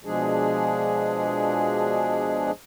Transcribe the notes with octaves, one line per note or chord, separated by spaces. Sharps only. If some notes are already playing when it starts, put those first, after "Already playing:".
B2 F3 G#3 D4 G#4